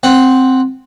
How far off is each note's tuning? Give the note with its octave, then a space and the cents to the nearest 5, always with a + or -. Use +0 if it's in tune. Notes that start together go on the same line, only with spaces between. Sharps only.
C4 +0 F#5 +0